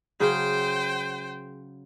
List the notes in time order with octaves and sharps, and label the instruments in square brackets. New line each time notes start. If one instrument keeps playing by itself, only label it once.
[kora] C#3 F#3 G#4 [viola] C5 G5